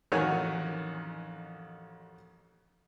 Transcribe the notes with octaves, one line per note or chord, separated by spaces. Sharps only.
A1 F2 D#3 F#4 C#5 G#5